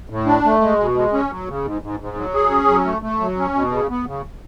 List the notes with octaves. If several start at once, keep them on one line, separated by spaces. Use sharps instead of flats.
A2
D4
A3
G#3
B2
G#3
C#4
F#3
C#3
G#2
G#2
G#2
F#3
G#4
C#4
F#3
A3
A3
F#3
C#4
B2
C#3
B3
C#3